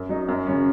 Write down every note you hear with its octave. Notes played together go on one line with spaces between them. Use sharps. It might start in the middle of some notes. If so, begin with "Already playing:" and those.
Already playing: F#2
F#3 D#4
F#2
C#3 F#3 C#4